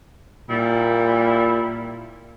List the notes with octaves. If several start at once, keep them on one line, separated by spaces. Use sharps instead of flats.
A#2 G3 E4